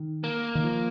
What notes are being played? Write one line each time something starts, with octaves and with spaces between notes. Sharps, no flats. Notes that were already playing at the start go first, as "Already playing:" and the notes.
Already playing: D#3
A#3
D#3
F3